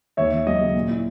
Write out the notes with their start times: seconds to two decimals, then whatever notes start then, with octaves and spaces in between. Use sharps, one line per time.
0.17 D#2 C#5 E5
0.32 D#2
0.47 F#3 D#5
0.61 C#3
0.74 A#2
0.89 E4